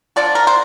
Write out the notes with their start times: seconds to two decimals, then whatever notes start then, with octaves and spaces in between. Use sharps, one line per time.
0.16 D3 F3 D4 D5
0.35 A#4
0.47 C5